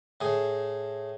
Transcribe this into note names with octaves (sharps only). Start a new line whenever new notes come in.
A2 G#4